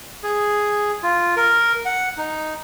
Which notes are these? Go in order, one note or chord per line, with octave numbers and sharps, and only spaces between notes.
G#4
F4
A#4
F#5
D#4